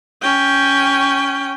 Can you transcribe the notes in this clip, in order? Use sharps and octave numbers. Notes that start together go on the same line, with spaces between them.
C#4 G5